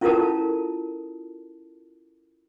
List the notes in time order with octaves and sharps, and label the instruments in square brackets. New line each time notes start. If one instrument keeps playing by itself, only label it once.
[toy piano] C#4 E4 F4 A4 A#4 A5